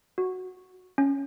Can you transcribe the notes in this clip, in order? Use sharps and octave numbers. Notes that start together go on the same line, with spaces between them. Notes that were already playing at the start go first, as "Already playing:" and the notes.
F#4
C#4